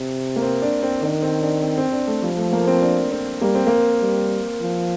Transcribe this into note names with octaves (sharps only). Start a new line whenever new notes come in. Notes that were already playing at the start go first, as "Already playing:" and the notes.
Already playing: C3
A#3
C4
D4
C4
D#3 D4
C4
D4
C4
C4
D4
A3
F3 G3
A3
A#3
C4
D4
C4
G3 A#3
C4
A#3
G3
F3